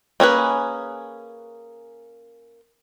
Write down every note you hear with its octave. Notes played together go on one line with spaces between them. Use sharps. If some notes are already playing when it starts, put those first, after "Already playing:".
A#3 C#4 G#4 B4